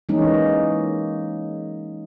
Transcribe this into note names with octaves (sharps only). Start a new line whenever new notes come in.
E3 G#3 A#3 C#4 D#4